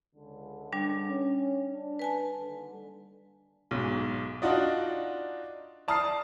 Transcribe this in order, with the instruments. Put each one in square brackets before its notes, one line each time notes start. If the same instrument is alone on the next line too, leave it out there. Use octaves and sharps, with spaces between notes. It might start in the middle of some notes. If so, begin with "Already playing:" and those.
[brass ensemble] C#2 D3
[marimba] G3 D4
[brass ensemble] C#4
D4
[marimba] B4 G#5 A5
[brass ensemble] D#2 D3
[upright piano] B1 G#2
D4 D#4 F4 F#4 D5 D#5
D5 A5 A#5 D#6 F6 C7